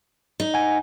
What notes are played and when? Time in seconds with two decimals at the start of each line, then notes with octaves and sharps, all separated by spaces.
0.40 D#4
0.54 F#5 G#5